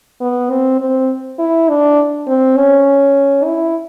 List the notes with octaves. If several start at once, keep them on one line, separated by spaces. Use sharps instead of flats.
B3
C4
C4
E4
D4
C4
C#4
E4